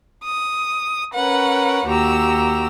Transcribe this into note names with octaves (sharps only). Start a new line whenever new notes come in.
D#6
C#4 A#4 B4 C#5 F#5
D#2 F#4 G4 A#5 E6